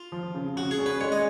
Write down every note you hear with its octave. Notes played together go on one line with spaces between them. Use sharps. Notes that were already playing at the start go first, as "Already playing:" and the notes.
Already playing: F4
F3
C#3
C#3 F#4
G#4
C#4
B4
G#3 C#5
D#5